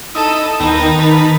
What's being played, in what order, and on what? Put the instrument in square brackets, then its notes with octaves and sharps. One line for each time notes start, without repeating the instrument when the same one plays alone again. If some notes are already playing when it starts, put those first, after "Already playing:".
[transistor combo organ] D#4 E4 D#5 [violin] A4
[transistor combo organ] D#2 B3 G5 [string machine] D#3 [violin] D#4
[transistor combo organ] B4 A5 B5